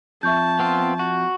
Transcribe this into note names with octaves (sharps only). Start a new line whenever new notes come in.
F2 E5 A5 C#6 G6
B3 C4 F4
F#4